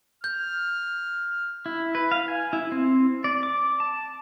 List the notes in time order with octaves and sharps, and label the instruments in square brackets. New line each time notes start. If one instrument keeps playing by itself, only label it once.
[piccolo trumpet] F6 [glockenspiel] G6
[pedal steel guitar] E4
B4
F5
G#5
E4
C4
D5
D6
A5